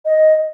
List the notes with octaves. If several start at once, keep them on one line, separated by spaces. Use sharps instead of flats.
D#5